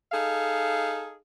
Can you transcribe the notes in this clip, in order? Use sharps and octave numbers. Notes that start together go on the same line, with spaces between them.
D#4 G#4 A4 F5